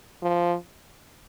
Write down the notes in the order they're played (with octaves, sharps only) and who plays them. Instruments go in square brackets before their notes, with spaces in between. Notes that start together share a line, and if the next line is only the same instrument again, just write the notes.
[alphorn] F3